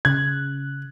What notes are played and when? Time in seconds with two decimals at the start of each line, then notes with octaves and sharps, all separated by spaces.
0.05 C#3 F#6 G#6